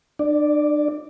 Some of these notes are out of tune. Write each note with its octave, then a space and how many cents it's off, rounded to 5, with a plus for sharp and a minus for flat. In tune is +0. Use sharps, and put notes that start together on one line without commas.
D4 +40 D5 +0